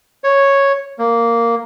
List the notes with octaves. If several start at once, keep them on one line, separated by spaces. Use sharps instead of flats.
C#5
A#3